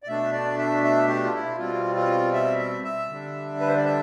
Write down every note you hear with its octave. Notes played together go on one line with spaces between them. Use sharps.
D5
B2 A3 D4 E5
D5
E5
E5
G4
F4
E4
B2 G3 C4 F4
F4
E5
E5
E5
D3 G3 D4
B4
C5
D5
E5